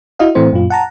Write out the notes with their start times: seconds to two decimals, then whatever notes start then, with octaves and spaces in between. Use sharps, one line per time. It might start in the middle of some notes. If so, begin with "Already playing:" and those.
0.19 E4 F#4 D#5 F5
0.35 A2 E3 A3 C4 C5
0.52 F#2 A#2 F4
0.70 F#5 A5 A#5